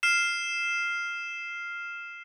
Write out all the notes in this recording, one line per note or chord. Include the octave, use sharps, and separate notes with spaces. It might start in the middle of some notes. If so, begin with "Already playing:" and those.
F6 C7 E7